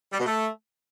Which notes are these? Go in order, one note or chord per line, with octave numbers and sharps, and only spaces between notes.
G3
B2
A3